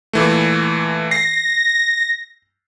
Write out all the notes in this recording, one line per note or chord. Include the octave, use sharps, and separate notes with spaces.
A#2 E3 A3
A#6 C7